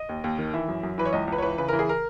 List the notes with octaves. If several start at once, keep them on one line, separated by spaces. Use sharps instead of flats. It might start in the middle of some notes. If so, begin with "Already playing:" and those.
Already playing: D#5
D#2
D#2
D#3
E3 E5
F#2
F#2
E3 B4
C#5
C#2 D#5
C#2 B4
C#5
E3 B4
C#3 B4
E3 A#4
G#4
A#4